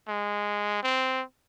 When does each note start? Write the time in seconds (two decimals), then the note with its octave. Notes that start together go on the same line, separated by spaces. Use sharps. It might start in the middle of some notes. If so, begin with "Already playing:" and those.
0.08 G#3
0.83 C4